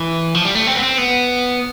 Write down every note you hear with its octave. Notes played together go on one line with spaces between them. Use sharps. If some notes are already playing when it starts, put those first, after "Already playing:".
Already playing: E3
F3
G3
A3
C4
B3
C4
B3